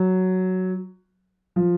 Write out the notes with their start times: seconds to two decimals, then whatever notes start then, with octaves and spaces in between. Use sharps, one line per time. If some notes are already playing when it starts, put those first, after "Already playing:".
Already playing: F#3
1.56 F3